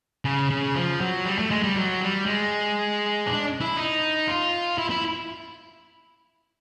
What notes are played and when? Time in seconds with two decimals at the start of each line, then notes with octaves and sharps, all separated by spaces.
0.25 C#3
0.50 C#3
0.75 F3
1.01 F#3
1.25 G3
1.39 A3
1.51 G#3
1.63 G3
1.76 F#3
2.01 G3
2.26 G#3
3.27 D4
3.61 E4
3.77 D#4
4.28 F4
4.78 E4
4.90 E4